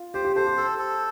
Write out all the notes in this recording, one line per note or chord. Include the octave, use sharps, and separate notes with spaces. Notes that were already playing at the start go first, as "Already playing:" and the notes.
Already playing: F4
G4 C5
G4
A4 C5
G4
A4
A4